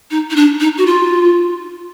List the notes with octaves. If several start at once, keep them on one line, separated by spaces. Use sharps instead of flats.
D#4
D#4
D4
D#4
F#4
F4